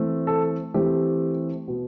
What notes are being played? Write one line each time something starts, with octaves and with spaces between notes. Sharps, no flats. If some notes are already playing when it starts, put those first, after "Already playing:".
Already playing: E3 A3 C4
A4
E3 A3 C4 G4
B2 B3